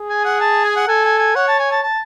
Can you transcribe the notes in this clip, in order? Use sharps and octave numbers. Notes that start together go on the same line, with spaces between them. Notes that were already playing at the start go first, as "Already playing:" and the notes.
Already playing: G#4
G#5
F#5
A5
G#5
F#5
A4 G#5
G#5
G#5
C#5 F#5
A5
G#5
A5
A5